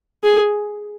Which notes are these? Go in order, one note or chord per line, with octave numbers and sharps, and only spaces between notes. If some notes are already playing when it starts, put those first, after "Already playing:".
G#4